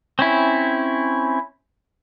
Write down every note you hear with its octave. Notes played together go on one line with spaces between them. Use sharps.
C4 C#4 E4